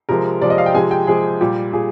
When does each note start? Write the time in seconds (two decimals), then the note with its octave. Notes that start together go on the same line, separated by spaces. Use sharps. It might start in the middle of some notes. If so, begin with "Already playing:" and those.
0.09 C3 F3 G#3 A#4
0.41 C3 F3 G#3 D5
0.50 D#5
0.58 F5
0.66 G5
0.74 C3 F3 G#3 G#5
0.91 G5
1.07 C3 F3 G#3 G#4
1.41 A#2 G3 G4
1.73 A#2 G#4